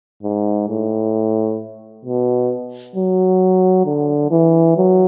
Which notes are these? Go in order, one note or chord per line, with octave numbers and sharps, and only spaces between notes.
G#2
A2
B2
F#3
D3
E3
F#3